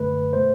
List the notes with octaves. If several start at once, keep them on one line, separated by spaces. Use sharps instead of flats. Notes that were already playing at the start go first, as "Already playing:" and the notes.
Already playing: F#2 D3 A3 B4
B2 A3 C5